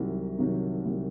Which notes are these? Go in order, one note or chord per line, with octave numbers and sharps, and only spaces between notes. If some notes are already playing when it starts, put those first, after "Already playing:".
Already playing: C2 C3 D#3 F#3
C3 D#3 F#3
C2